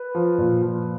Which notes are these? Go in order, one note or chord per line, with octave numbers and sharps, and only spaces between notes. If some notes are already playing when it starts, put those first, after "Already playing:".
Already playing: B4
F3
A#2
F3